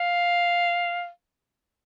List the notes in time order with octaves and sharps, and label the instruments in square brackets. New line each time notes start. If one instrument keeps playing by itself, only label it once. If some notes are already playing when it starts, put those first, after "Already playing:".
Already playing: [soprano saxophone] F5